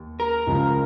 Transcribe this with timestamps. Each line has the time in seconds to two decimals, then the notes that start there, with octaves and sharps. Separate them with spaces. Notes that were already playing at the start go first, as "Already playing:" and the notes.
Already playing: D#2
0.20 A#4
0.47 C#2 C#3 F3